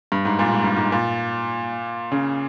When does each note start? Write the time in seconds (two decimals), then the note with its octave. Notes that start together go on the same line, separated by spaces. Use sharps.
0.12 G2
0.25 G#2
0.39 A#2
0.52 G#2
0.64 G2
0.76 G#2
0.92 A#2
2.12 C#3